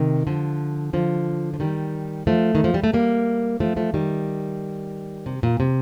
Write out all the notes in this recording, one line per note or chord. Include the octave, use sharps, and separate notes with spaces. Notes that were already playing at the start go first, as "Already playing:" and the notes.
Already playing: C3 D#3
D3 F3
D3 F3
F3
D#3 G3
F3 A3
D#3
F3
G3
A3
G3 A#3
F3 A3
F3 A3
D#3 G3
C3
A#2
C3